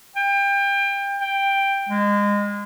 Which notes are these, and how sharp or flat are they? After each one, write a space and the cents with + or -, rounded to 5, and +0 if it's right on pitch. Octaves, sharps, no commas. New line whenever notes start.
G5 +25
G5 +5
G#3 -25